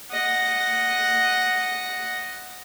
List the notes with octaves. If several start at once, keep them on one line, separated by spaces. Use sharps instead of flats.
D#5 F#5